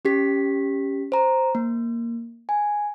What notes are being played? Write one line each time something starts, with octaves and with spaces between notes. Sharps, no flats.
C#4 G4 B6
C5 A#5
A#3
G#5